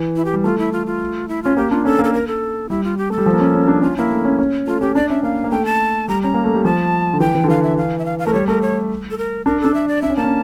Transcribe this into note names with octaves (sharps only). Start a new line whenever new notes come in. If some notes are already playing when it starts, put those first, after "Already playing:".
Already playing: E3
E4
G4
G3
A3 F4
E4
F4
F4
E4
C#4 F4
A#3 G4
D4 F4
C#4 A4
A#3
A4
A#4
A4
G3 E4
F4
G4
A3 A4
G3
F3
A#3
C#4
C#4
D4
C#4 F4
A#3 E4
A3
C#4
C#4
A3 F4
C#4 G4
D4 D5
C#4 E5
A#3 F5
A#3
A3 G5
A5
G3 A#5
C#4 A#5
A#3
A3
G3
F3 A5
D3
E3 G5
E3
D3
E3 F5
E5
F5
E5
F5
F5
A3 A#4
G3 C#5
A3 A#4
C#5
A4
A#4
D4 A#4
D4 A4
E5
D5
D4 E5
C#4
A#3 A5
C#4